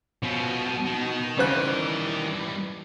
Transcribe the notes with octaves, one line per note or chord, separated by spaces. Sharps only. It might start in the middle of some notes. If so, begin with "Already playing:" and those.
B2 F3 C#4
D#3
C#3 E3 G3 C5 F#6